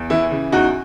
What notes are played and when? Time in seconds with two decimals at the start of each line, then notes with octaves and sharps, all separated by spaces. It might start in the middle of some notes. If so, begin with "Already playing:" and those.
Already playing: E2
0.10 E3 E4
0.31 C#3
0.52 E2 D#4 F#4